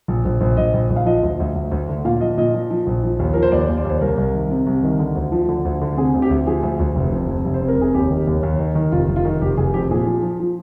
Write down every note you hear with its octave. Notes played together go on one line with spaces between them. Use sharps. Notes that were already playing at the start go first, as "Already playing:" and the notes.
A#1
A#1
A#1
A#1 D#5
A#1
A#1
F5
F3 D#5
D2
D2
D2
D2
D3
A#2 F5
F3 D#5
A#2 D#5
F3
F3
A#1
F3
D#2
F3 A#4
C5
D#2 D5
D#2
D5
D#2 C5
C2 A#4
C2
D#3
C3
C2
D#3
D3
D2
F3
D3
D2
D3
C3 G#4
D2
G4
D2
F3 G#4
D2
D2
F1
F2
F2
F1
C5
C3
A#4
F1 G#4
D#2 G4
D#3
D#2
D#2
D#3
D#3
F1 F4
F1
F4
D#3
F1 G4
F1 G#4
F2 G4
A#2 G#4
F3
F3
F3